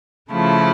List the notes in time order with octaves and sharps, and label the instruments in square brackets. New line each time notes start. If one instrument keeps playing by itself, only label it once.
[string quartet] C#3 F3 A3 E4